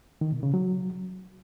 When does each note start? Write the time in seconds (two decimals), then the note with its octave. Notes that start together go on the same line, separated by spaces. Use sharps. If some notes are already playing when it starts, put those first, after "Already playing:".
0.21 D#3
0.32 B2
0.43 C#3
0.54 F#3